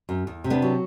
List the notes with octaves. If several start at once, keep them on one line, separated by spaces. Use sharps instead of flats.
F#2
E2
C3
B3 D4
F#3